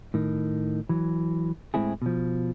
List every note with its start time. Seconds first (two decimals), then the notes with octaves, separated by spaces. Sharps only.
0.14 A2 D#3
0.89 E3 F#3
1.74 A2 G#3 C4 E4 G#4
2.02 B2 F3